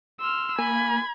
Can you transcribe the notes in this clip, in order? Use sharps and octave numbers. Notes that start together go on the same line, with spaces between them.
C6 E6 F6
A#3 G#5 B5 G#6